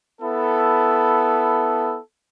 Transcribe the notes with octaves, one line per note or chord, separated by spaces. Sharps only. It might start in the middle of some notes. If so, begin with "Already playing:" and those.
B3 E4 A4